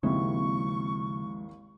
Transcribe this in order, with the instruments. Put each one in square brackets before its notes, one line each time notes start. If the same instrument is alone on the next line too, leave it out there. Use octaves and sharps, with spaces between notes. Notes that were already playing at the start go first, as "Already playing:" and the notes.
[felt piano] G#1 D#2 E4 [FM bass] C#3 [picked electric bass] F3 G#3 C4 [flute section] C#6